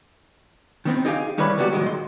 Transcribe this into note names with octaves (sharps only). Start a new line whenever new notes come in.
D#3 B3 C4
D#4 G4 G#4 D5 F5
C2 D#3 G3 E4 B4 C#5
C#2 G3 B3 F#4 G4
A#2 D#3 F#3 G#3
C6